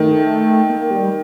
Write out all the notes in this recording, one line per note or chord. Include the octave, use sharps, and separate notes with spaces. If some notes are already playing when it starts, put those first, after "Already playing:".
Already playing: D#3 A3
A#3
G3